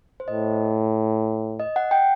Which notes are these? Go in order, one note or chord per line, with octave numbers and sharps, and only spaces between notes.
C5
A2 D#5
D#5
F#5
G5